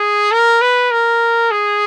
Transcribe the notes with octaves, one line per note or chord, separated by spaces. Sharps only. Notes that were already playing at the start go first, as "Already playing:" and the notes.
Already playing: G#4
A#4
B4
A#4
G#4